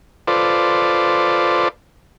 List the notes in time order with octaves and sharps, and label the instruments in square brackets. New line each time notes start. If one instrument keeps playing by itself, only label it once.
[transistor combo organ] F4 A4 B4 C5 D5